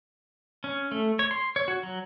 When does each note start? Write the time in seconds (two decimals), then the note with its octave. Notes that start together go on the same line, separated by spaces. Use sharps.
0.64 C#4
0.91 A3
1.19 C#5
1.31 C6
1.56 C#5
1.68 F#4
1.83 F#3